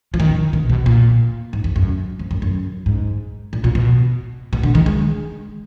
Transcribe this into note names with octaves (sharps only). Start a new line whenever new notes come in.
F3
D#3
B2
B2
A#2
G#2
F2
F#2
F2
F#2
F#2
G#2
A#2
A#2
B2
B2
D3
D#3
G#3